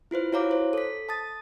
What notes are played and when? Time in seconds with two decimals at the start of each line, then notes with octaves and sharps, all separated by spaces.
0.11 E4 F4 B4 C5
0.33 E4 F#4 C#5 F5 A#5 D6
0.51 C5
0.73 A4 B6
1.09 A5 D#6 A6